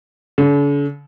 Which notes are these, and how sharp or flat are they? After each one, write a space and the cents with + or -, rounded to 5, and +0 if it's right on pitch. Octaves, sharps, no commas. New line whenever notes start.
D3 -45